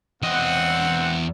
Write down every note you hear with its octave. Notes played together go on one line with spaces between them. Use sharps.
E2 C4 D#5 F#5